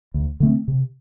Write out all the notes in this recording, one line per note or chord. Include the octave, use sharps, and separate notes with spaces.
D2
D3 A3 C4
C3